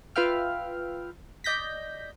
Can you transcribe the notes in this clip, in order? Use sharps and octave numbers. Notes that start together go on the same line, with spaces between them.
F4 B4 E5 F5 G5 F6
D5 D#5 G6 A#6 B6